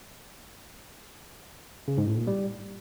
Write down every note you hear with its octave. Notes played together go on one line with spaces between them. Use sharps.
C#3
G#2
A2
A#2
G3